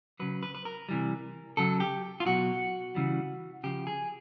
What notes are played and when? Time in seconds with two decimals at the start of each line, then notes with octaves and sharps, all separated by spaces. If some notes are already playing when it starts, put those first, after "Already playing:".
0.20 C#3 F#3 B4
0.43 B4
0.55 B4
0.65 A#4
0.89 C3 E3 G3
1.57 C#3 F#3 A4
1.80 G4
2.20 F4
2.26 B2 F#3 F#4
2.95 C#3 E3 G3
3.63 C#3 F3 G4
3.87 G#4